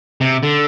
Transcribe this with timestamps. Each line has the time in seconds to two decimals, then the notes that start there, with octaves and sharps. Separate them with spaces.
0.21 C3
0.43 D3